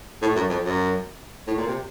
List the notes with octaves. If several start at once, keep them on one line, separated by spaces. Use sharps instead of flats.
A2
F#2
F2
F#2
A2
A#2
C3